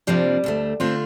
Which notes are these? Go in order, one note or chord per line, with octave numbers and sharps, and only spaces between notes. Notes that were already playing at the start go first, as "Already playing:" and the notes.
F2 C3 F3 G3 A#3 D4
D2 D3 A3
D3 A3 C4 D4 F4